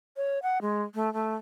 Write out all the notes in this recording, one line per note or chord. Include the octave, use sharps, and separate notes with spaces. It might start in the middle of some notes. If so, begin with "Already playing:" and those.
C#5
F#5
G#3
A3
A3